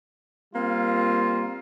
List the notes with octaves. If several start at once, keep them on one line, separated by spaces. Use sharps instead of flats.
G3 A#3 C4 F4